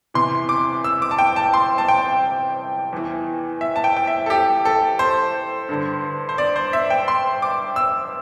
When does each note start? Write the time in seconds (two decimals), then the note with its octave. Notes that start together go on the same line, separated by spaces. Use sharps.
0.14 E2 C3 E3 C6
0.49 D6
0.84 E6
1.02 D6
1.11 A5
1.18 G5
1.36 A5
1.54 C6
1.78 A5
1.88 G5
2.92 E2 E3
3.61 E5
3.76 A5
3.84 G5
3.96 G5
4.07 E5
4.26 A4
4.30 G4
4.65 A4
4.99 C5
5.69 G2 D3
6.29 C5
6.38 D5
6.56 C5
6.73 E5
6.90 G5
7.08 C6
7.42 D6
7.76 E6